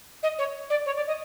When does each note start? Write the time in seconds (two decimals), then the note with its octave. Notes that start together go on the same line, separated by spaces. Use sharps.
0.23 D#5
0.38 C#5
0.70 D5
0.86 C#5
0.96 D5
1.07 D#5